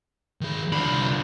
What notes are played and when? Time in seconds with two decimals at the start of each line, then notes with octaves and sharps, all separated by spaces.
0.41 D#3 G#4
0.73 C2 D3 F3 B5